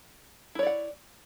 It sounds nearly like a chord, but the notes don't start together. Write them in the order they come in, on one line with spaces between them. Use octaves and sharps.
E4 C#5 D5 F#5